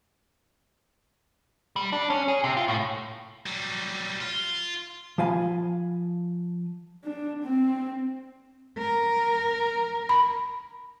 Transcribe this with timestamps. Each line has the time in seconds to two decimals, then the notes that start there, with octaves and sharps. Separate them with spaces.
1.76 G3
1.92 D4
2.10 C#4
2.28 G#4
2.44 C3
2.57 F4
2.68 A2
3.46 F#3 G3
4.21 F4
5.18 F3 F5 G#5 B5
7.04 D4
7.43 C4
8.78 A#4
10.09 B5